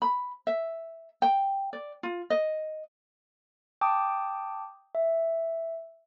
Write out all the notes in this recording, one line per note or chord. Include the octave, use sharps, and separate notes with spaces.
B5
E5
G5
D5
F4
D#5
G5 A5 D6 D#6
E5